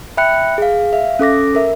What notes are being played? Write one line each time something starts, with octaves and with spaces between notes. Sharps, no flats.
E5 G5 B5 F#6 C#7
G#4 F5
E5 F5
C#4 A4 D6 A#6
A#4 E5